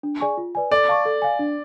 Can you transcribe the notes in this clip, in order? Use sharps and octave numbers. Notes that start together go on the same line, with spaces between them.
D4
G#4 D5 G#5 C#6
F4
B4 D5 G#5
A4 D5
F5 A5 C#6
A4
F5 G#5
D4